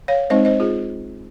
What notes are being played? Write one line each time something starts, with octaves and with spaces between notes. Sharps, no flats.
C#5 F5
G#3 C4 D#4 C5 D#5
C5 D#5
F4 G#4